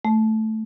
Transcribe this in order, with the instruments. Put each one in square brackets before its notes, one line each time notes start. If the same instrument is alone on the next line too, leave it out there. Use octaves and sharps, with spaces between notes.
[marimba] A3